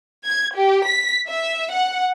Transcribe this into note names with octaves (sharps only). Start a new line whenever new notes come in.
G#6
G4
B6
E5
F#5